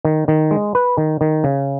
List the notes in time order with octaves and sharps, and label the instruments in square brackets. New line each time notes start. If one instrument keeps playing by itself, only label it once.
[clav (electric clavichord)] D#3
D#3
G#3
B4
D#3
D#3
C#3